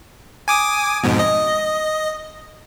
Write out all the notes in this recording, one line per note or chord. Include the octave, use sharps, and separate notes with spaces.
G#5 D6 D#6
F2 G#2 B2
D#5